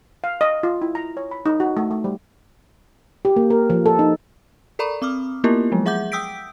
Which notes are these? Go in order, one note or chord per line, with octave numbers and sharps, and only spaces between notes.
F5
D#5
F4
E4
A#5
C#5
B5
D#4
F#4
A3
A3
G3
G4
A#3
A#4
F3
A4
D#4
A4 A#4 D5 A#5 B5 C#6
C4 D6 D#6 F6
A#3 B3 E4 F4 G4 A#4
F3 F#3 G#3
G#4 E5 F#5 D6 G6
G5 D#6 E6 G6 B6 D7